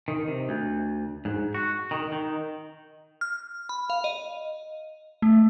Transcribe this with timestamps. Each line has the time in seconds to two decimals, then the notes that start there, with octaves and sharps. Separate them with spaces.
0.08 D#3
0.28 C3
0.49 D2
1.25 G#2
1.54 F#4
1.91 D#3
2.12 D#3
3.21 F6
3.69 B5
3.90 F5
4.04 D#5
5.22 A3